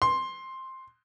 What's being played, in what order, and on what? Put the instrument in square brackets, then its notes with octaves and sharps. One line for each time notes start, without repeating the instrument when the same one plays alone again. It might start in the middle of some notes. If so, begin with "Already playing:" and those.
[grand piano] C6